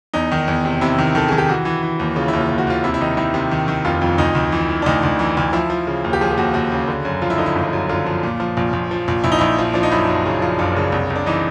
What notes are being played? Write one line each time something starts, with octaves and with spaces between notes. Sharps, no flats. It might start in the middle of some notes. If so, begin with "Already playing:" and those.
E2 D#4
D#3
E2
C3
C3 E4
D#3
D#3 A4
D#3 G#4
G4
E3 F#4
E3
E3
D#2
C#3 F4
D#2 E4
F4
D#2
F#4
D#2 F4
C3 E4
E4
D#3 D#4
D#3 E4
C3
D#3
D#3
F1 F4
F2
D2 D#4
D2
E3
E3
D4
D2 D#4
D2
E3
D2
F3 E4
F3
C#3
D#2
G4
F3 G#4
G4
D#2 F#4
D#2 F#4
C#3
D3
F#2
F3 F4
E4
D3 D#4
E4
G1
F#2
D3 F4
F3
A#2
F3
A#1
A#1
F3
A#1
A#1 E4
D#4
A#1 E4
F3
F3 D4
D#4
F#2 E4
F#2
C#3
F3
F#1 D4
C#3
C2
C2
D4
E3 D#4